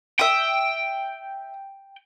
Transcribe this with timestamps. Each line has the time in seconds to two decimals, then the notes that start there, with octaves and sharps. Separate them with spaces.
0.19 E5 G5 D#6